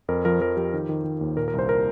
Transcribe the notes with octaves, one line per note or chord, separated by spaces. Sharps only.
F2 A#4
F3 A#4
F3 A#4
F3 G4
D#3
D#3
D#3
D#2
A#2 A#4
A#4
C2
C5
A#4